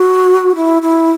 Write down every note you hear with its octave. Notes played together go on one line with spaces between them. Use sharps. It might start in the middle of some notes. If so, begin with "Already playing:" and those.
Already playing: F#4
E4
E4